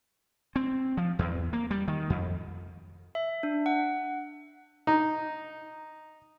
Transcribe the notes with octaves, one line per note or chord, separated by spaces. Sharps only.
C4
F3
E2
A#3
G3
D#3
F2
E5
D4
F#5
D#4